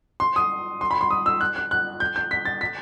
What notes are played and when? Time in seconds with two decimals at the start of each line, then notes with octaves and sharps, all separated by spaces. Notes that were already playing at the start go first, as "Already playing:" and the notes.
0.20 C6
0.36 D#6
0.81 C6
0.91 B5
1.01 C6
1.10 D#6
1.26 E6
1.41 F#6
1.56 F#6
1.71 F#6
2.00 G6
2.16 G6
2.31 B6
2.45 A6
2.61 B6